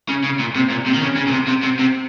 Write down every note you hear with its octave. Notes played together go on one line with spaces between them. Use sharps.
C#3
C#3
A#2
C3
A#2
C3
D#3
C#3
C#3
A#2
C3
C3
C3
C3